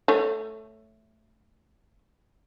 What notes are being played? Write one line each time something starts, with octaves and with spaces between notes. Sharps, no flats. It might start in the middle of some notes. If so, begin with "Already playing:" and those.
A3 C#5